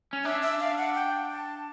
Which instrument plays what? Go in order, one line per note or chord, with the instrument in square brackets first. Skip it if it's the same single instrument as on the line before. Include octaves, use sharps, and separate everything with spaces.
[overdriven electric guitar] C#4
[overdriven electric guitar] D4 [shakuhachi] E5
[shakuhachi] E5
F5
F#5
G5
A5